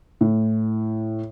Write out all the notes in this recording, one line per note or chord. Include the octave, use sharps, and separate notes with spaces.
A2